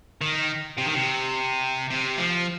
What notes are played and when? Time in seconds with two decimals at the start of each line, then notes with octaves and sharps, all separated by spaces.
0.21 D#3
0.78 C3
0.86 D#3
0.95 C3
1.90 C3
2.18 F3